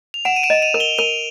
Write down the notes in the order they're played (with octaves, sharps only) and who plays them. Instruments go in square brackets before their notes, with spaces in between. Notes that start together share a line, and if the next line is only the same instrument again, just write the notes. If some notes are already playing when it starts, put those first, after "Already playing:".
[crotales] F7
[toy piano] F#5 [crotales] D7 E7
[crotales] D#7
D7 E7
[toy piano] D#5
[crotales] D#7 F7
[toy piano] A#4
[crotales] F7 G7
[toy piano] A#4 [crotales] D#7 F7